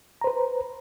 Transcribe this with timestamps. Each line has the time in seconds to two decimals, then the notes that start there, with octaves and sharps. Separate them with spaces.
0.21 A#5
0.24 C5
0.27 B4